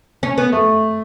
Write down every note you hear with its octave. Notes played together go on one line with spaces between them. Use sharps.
C#4
B3
A3